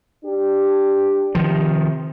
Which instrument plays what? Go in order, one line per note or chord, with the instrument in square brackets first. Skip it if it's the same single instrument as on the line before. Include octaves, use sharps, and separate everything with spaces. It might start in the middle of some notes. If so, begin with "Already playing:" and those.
[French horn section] D4 G4
[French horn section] C3 [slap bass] D#3 F3